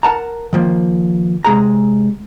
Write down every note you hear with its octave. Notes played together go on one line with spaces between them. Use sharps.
A#4 F#5 A5 A#5
D#3 F3 A#3
C3 G#3 G#4 A#5